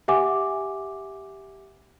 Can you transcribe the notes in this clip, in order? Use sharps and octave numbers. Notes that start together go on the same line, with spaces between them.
G4 E5 F#5 G#5 D6